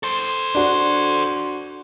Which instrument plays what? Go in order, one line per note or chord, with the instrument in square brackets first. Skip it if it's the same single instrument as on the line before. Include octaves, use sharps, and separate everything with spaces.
[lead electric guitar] A4 C5
[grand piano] D4 F#4